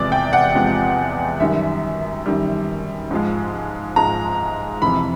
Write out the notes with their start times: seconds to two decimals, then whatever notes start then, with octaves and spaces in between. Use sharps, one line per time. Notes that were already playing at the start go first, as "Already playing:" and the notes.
Already playing: E2 C3 F3 G#3 D5
0.12 G5
0.33 F#5
0.55 E2 C3 F3 G#3
1.40 F#2 D#3 G3 E5
2.26 F#2 D#3 G3
3.11 G#2 F3 G#3
3.96 G#2 F3 G#3 A#5
4.82 F2 C3 E3 B5